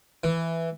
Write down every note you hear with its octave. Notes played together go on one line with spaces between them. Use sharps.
E3